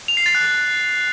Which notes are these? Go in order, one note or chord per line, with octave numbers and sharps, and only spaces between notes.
F7
C7
A6
F#6